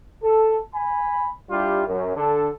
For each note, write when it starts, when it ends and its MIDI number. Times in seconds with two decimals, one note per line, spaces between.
0.22 0.58 69
0.74 1.29 80
0.74 1.29 83
1.50 1.83 55
1.50 1.83 62
1.50 1.83 64
1.50 1.83 65
1.50 1.83 67
1.87 2.15 42
2.16 2.49 50
2.16 2.49 62
2.16 2.49 69